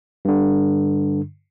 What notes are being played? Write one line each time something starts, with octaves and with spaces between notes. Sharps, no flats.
G2 D3